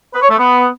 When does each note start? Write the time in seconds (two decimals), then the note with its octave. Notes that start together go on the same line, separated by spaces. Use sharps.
0.14 B4
0.22 C#5
0.30 A3
0.38 B3